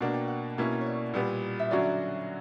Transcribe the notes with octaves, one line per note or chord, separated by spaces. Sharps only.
B2 A#3 D4 F#5
G5
F#5
B2 A#3 C#4 E4
C#5 D5
A#2 G3 B3
E5
D3 F#3 C#4 F#4 D5